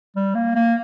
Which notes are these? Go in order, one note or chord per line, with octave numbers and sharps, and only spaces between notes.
G3
A#3
A#3